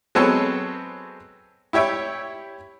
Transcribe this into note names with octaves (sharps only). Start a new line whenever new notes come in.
F#3 G#3 B3 C4 A4 C#5
E4 G4 C#5 E5 G5